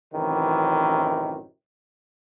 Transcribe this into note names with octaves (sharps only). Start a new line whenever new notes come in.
A1 F#2 C3 D#3 E3